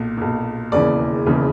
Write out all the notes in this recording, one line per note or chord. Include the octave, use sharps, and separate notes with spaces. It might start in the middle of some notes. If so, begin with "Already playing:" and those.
Already playing: B1 A#2
B1 A#2
E1 D#2 C#3 E3 D5
E1 D#2 C#3 E3